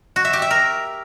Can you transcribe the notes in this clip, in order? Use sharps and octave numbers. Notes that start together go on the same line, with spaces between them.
F#4
E5
G4
E5
A#4